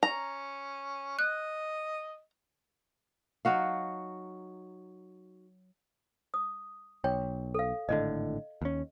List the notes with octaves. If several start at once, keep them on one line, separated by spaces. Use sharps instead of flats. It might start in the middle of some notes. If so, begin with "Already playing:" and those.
C#4 A#5
D#5 F#6
F#3 D#4 F#4 F5
D#6
B1 C#5 G5
A4 F5
G#1 A2 D3 D#5
D#2 C#4